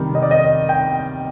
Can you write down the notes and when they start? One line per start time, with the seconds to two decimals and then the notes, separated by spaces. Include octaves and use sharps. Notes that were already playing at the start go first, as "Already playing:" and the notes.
Already playing: C3 D#3 G3
0.15 D#5
0.22 D5
0.31 D#5
0.69 G5